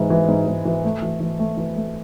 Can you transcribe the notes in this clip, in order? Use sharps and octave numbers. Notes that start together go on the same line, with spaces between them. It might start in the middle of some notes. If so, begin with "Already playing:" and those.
Already playing: G#2 E3 G#3
E3
G#2
G#2
E3
A3
E3
E3
A3
E3
A3